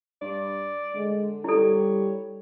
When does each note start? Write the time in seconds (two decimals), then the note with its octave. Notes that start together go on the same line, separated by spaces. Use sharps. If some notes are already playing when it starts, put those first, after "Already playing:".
0.22 G2 D5
0.95 D3 G#3
1.44 G3 E4 A4 C#5